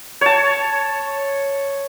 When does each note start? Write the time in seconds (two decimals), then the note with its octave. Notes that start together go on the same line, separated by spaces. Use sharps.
0.21 C#5 A5